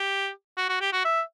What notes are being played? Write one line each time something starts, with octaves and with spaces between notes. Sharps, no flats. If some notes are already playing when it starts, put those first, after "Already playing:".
Already playing: G4
F#4
F#4
G4
F#4
E5